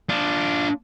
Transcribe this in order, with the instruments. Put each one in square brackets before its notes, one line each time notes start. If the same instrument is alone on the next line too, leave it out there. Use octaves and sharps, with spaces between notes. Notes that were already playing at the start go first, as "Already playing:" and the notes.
[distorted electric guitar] D4 F4